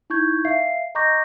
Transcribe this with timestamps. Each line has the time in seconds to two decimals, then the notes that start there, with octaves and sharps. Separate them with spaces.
0.10 D#4 E4 C#6 G6 G#6
0.45 E5 F5 C7
0.95 D#5 A#5 C#6 D6 G6 A#6